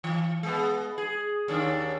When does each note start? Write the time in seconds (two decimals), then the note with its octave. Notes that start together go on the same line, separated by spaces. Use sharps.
0.04 E3
0.43 G#3 B3
0.98 G#4
1.48 D#2 C#4 D4